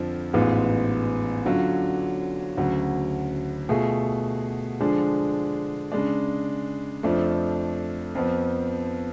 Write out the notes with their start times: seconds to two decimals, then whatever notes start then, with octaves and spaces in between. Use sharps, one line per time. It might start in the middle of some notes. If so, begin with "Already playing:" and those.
Already playing: F2 D3 F3
0.33 A1 G#2 G#3 B3 F4
1.45 D3 F#3 C#4 F4
2.57 D2 C#3 F#3
3.69 B2 A3 F4 G#4
4.80 D3 F3 G#3 D4 G#4
5.92 C#3 G#3 D4
7.03 F2 F3 A3 D4
8.15 F2 F3 B3